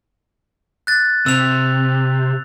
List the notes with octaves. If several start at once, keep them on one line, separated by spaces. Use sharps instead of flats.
F#6 A6
C3 E6 F7